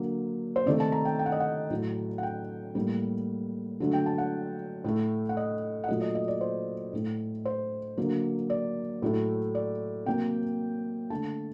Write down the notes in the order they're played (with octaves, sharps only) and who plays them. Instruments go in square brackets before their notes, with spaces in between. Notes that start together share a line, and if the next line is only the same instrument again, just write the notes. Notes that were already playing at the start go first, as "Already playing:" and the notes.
Already playing: [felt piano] D3 F#3 A#3
C5
C3 D#3 A3 D5
A5
A#5
G5
G5
F#5
D#5
F#5
A2 F#3 A3
F#5
G5
A2 G3 A#3
D3 F#3 A3
G5
A5
F#5
A2 A3
F#5
D#5
F#5
A#2 F#3 A3 D#5
D#5
D#5
D5
C5
A2 A3
C5
D3 F#3 A#3
D5
A2 F#3 A3
D5
C3 F#3 A#3 G5
D3 A3 A5